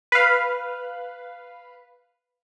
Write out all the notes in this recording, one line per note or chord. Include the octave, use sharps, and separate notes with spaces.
B4 F5